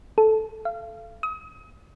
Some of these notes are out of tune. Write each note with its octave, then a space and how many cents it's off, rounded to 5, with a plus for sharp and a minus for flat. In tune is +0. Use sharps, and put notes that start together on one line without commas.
A4 -10
F5 -35
D#6 +35